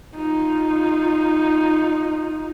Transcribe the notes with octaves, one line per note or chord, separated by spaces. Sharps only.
D#4 F4